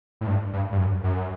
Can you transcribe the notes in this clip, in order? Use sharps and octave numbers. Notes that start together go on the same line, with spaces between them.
A2
G2
G2
G2
F#2
F#2